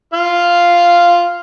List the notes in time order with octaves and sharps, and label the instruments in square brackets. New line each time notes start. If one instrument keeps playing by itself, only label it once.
[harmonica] F4 F5